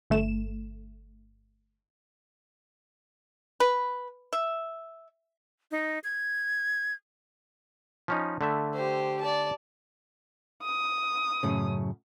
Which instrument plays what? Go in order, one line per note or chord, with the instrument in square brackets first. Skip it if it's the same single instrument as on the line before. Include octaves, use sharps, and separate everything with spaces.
[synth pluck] G1 A3 E7
[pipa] B4
E5
[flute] D#4
G#6
[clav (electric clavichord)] F3 C#4 D#4
D3 A3 E5
[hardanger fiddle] G4 C5
D5 A5
[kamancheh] D#6
[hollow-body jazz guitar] F#2 A2 C#3